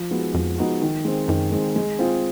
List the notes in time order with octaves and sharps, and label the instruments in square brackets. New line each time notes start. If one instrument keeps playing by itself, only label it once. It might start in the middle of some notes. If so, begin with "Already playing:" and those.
Already playing: [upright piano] F3
G#3 B3 D#4 F#4
[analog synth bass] F2 [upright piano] F3
[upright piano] G#3 B3 D#4 F#4
D#3
G#3 C4
[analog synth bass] F#2 [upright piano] D#3
[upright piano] G#3 C4
G#3
C4 F4 G#4